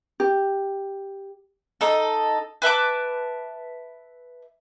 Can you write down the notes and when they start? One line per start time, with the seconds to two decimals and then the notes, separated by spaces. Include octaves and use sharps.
0.20 G4
1.81 D#4 A4
2.62 B4 E5 A5 D6